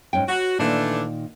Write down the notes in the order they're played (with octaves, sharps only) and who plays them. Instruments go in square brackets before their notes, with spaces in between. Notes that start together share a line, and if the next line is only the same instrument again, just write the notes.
[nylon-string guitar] G#2 C#4 G5
[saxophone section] F#4 [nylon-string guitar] B4
[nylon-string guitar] A#2 D#3 [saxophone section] E3 A3 D4